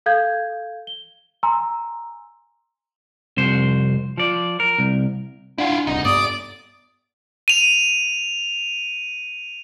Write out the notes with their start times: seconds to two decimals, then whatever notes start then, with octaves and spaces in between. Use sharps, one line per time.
0.06 A4 F5 G6 G#6
0.87 G7
1.43 G#5 A#5 C6 E6
3.37 C2 F2 C5
4.18 F3 D5
4.60 A#4
4.79 C2
5.58 D4 E4 F4 F#5 G#5
5.87 D#1 C2 C3 D#4
6.05 G2 B3 D5 D#6
7.48 D#7 F7